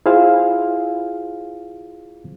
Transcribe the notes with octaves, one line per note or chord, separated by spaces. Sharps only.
E4 F4 G#4 C5 F5